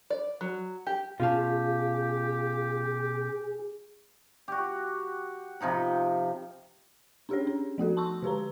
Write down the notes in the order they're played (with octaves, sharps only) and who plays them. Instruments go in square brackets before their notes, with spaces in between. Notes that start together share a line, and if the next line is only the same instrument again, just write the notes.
[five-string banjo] D5
F#3
G4
[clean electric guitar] B2 C#4 A5 [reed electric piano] F4 F5 [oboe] G4 [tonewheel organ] G#4
[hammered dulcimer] F#4 G4
C3 F3 D#4 B5
[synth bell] C#4 D4 G4 G#4 C#5
C#4
F3 A3 F#4 A4
A5 C6 C#6 E6
D3 G4 B4 A#5